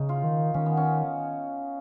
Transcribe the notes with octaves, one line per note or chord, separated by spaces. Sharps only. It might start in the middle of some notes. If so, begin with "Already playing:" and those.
Already playing: C#3 C#4 D#4
F4
D#3
D#3 C#4
B3
C#4